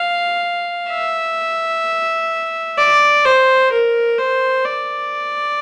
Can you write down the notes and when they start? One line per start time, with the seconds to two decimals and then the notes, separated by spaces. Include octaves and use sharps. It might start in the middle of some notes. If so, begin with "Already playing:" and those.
Already playing: F5
0.91 E5
2.78 D5
3.25 C5
3.72 A#4
4.18 C5
4.65 D5